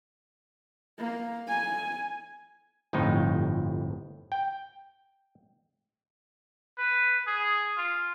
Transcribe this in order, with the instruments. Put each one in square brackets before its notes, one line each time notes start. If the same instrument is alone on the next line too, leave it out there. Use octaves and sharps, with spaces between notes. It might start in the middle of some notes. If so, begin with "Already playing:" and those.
[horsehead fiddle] A#3
G#5
[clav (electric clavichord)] G1 F2 A2 F3 D#4
G5
[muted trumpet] B4
G#4
F4